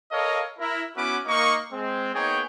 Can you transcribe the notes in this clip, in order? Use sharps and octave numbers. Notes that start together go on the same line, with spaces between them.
A4 A#4 C#5 D#5 F5
E4 A#4
B3 C#4 E4 F#4 B4 D6
A#3 D#4 C#6
G#3 C4
A#3 B3 D#4 G#4 C#5 G5